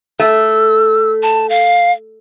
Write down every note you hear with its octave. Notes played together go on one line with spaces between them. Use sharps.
A3 E6
A5
F5